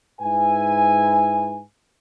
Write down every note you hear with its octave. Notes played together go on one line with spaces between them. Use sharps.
G#2 E4 B4 G#5